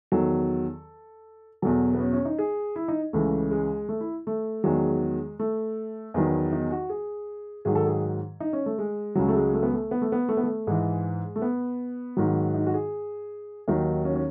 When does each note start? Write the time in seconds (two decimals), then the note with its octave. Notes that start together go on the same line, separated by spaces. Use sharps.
0.12 E2 D#3 F#3 A4
1.62 E2 B2 F#3 A4
1.94 B3
2.00 C#4
2.13 C#4
2.25 D#4
2.39 G#4
2.76 E4
2.88 D#4
3.13 C#2 C#3 E3 A3
3.51 G#3
3.89 A3
4.01 E4
4.27 A3
4.64 E2 D#3 F#3 G#3
5.39 A3
6.14 E2 D#3 F#3 B3
6.52 D#4
6.71 F#4
6.90 G#4
7.65 G#2 D#3 F#3 G#4
7.75 A4
7.86 G#4
8.40 D#4
8.53 C#4
8.66 A3
8.79 G#3
9.15 C#2 C#3 F#3
9.28 A3
9.35 G#3
9.54 A3
9.63 B3
9.73 A3
9.91 B3
10.02 A3
10.12 B3
10.29 A3
10.37 B3
10.43 A3
10.67 G#2 E3 G#3
11.36 A3
11.42 B3
12.17 G#2 D#3 F#3
12.54 D#4
12.67 F#4
12.74 G#4
13.68 D#2 D#3 F#3 D#4
14.05 C#4
14.16 C#4